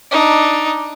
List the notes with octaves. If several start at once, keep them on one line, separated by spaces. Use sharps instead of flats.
D4 D#4